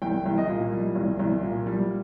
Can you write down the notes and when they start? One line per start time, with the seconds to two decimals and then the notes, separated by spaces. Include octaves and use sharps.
0.02 C2 G5
0.26 C2
0.38 D#5
0.49 A#2
0.72 G3
0.95 C2
1.19 C2
1.43 A#2
1.66 G3